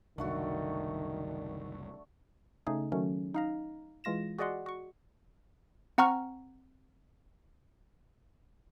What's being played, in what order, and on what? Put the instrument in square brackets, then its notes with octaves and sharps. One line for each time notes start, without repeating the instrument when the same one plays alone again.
[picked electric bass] F#1 C2 [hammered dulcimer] D3 A3 F#4 [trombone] D#3
[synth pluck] C#3 A3 D#4 G#4
D#3 F#3 A3 C#4
D#4 F5 A#5
E3 G#3 F4 A#6 E7
F#4 G#4 D5 D#5 F#5 C6
F#4 C#6
[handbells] C4 F#5 A#5 C#6 F6